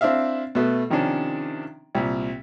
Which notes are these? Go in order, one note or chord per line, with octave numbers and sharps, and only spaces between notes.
C4 D4 E4 E5 F5
B2 A3 B3
C3 D#3 F3 C#4 D4
C2 A#2